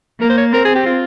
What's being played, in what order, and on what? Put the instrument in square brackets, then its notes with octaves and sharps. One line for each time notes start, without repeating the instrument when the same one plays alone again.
[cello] A#3 [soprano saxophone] A#4
[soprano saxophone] C5
C#5
[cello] C4 [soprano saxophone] A#4
[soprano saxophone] G#4
G4
F4